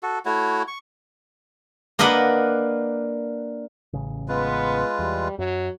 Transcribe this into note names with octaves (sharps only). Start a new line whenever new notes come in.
F#4 A4
A3 E4 F#4 C#5
C#6
A#3 D4 A#4 B4 D#5 F#5
A1 C#3
G#3 B3 F4 B4
E2 G3
F#2 F#3